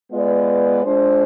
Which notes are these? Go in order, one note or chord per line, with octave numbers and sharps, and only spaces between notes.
G#3 B3 F4 B4 D5
G#3 D4 F4 C5